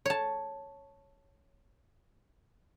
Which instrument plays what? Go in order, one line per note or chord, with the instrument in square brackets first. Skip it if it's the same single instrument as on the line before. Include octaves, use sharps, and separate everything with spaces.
[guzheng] C#5 A5